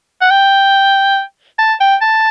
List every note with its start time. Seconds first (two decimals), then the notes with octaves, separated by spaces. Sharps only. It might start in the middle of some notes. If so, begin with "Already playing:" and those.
0.21 F#5
0.31 G5
1.59 A5
1.81 G5
2.02 A5